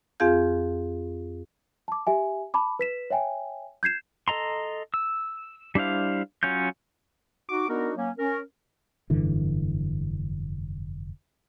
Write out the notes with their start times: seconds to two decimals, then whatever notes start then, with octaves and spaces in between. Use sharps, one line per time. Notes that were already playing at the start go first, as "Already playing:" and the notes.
0.20 F2 C4 F4 G#4 F5 G6
1.88 A5 D6
2.07 G4 E5 G#5
2.54 A5 B5 D6
2.79 B4 B6 E7
3.10 C#5 E5 G5 G#5
3.83 G6 G#6 C7 E7
4.28 A4 D#5 A#5 C6
4.94 E6
5.75 G3 D4 E4 C5 F5
6.43 F#3 C#4 F4 G6
7.49 D#4 F#4 D6
7.69 B3 D4 D#4 F#4 A#4
7.96 F#3 A#3 C#4
8.19 C#4 A#4
9.10 F1 G2 D3 E3